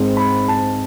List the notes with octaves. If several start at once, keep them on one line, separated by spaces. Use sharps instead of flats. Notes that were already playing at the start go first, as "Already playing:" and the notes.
Already playing: G#2 G#3 C4
B5
A5